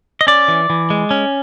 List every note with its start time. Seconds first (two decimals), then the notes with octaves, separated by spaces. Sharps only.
0.21 D#5
0.27 C#4 D5
0.48 E3
0.70 E3
0.90 G#3
1.11 C#4